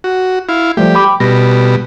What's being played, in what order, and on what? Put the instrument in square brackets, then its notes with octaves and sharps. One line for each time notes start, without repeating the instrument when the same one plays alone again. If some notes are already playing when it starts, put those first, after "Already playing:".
[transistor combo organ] F#4
E4 F5
[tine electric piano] F3 G3 A3 [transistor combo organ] G4
[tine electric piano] G5 B5 D6
[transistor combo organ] B2 G3 [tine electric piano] A#6